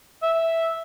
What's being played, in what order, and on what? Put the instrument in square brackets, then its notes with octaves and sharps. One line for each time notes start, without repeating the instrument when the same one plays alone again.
[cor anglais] E5